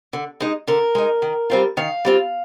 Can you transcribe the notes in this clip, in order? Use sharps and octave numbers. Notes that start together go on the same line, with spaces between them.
D3
G#3 D#4
D3 A#4
G#3 D#4
D#3
G3 C4 F4
D#3 F5
G3 C4 F4